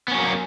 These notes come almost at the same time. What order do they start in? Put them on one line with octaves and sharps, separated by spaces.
B3 C#4 F#3 A#3